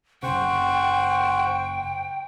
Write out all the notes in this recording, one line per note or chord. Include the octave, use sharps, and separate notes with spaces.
F#1 C#3 C5 F#5 G5 C#6